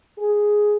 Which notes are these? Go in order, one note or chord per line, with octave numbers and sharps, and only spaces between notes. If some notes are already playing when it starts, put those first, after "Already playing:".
G#4